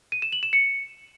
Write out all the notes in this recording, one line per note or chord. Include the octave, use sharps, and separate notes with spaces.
D#7
E7
F#7
E7
C#7